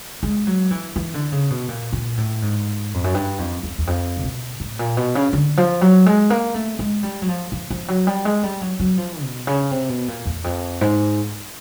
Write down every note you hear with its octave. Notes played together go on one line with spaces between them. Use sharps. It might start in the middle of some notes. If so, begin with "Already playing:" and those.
G#3
F#3
E3
E3
D3
C#3
B2
A#2
A#2
A2
G#2
F2
F#2
G2
F2
F2
E2
F2
C3
B2
A2
A#2
B2
C#3
D3
F3
F#3
G#3
A#3
A3
G#3
G3
F#3
F3
F3
F3
F#3
G3
G#3
G3
F#3
F#3
F3
B2
C#3
C3
B2
A#2
E2
F2
G#2